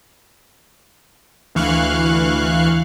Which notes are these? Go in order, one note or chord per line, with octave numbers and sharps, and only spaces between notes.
D2 E3 F5 C#6 F#6